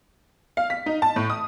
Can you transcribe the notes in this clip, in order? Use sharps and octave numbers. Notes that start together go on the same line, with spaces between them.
F5
B6
D#4
A5
A2
D#6